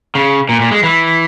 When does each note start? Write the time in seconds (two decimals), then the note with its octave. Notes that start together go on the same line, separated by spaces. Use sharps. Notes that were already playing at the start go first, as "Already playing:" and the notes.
0.15 C#3
0.49 A#2
0.60 A#2
0.71 G#3
0.83 E3